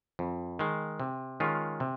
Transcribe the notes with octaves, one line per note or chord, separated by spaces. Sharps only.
F2
D#3 G#3
C3
D#3 G#3 C#4 F4
C3